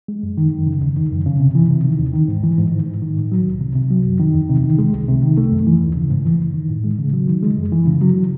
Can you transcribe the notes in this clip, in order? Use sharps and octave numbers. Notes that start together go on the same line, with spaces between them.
G#3
F#2
D#3
F#2
C#3
E2
D#3
F#2
C#3
C3
E3
C3
D#3
D#2
D#3
G#2
E3
G#2
D#3
G#2
D#3
A2
F#3
C2
C3
C3
F#3
F#2
D#3
E2
C3
D#3
G#3
C2
C3
D#3
A3
F#2
E3
D#2
C#3
G#2
E3
F#2
D#3
A2
G#3
C#3
F#3
D#3
G#3
F#2
E3
C#3
F#3